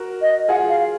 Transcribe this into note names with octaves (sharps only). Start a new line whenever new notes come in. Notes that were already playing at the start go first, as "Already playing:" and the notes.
Already playing: F#4 A#4
D#5
F4 G#4 F#5
F5